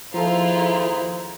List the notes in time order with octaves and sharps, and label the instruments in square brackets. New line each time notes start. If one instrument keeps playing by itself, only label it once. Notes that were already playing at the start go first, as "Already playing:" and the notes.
[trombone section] D#2 G#4 C5 [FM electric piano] F3 A4 [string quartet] E4 F4 [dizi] A#5